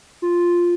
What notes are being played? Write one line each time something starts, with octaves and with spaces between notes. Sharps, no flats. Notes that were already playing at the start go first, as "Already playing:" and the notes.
F4